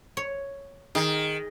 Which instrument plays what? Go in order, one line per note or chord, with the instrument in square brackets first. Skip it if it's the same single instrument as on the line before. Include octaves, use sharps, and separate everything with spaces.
[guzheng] C#5
[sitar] D#3 [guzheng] G#4